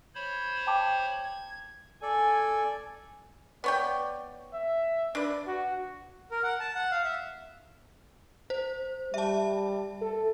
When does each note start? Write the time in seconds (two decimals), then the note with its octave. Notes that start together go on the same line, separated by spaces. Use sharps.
0.15 C5 C#5 B5
0.67 G5 A5 D6
1.24 G#6
2.02 A4 D5 G#5
3.64 B3 C#5 D5 G5
4.53 E5
5.15 D4 B4 D5
5.47 F#4
6.31 A#4
6.43 F#5
6.60 A5
6.75 F#5
6.91 F5
7.04 E5
8.50 C5
9.14 G3 E5 A5
10.01 A4